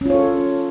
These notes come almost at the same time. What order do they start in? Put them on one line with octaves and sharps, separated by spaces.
C#4 F4 C#5 A4